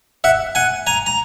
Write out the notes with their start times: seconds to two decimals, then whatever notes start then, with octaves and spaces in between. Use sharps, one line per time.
0.24 E5 F#5
0.55 F#5 G#5
0.87 G#5 A#5
1.06 A#5